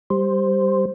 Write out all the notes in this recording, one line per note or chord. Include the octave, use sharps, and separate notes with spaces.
G3 C5